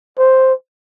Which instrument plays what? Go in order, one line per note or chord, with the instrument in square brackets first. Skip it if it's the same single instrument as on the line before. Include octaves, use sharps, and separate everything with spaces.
[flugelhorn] C5